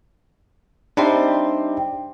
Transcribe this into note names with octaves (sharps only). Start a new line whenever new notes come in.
G3 C4 D4 D#4 C5 E5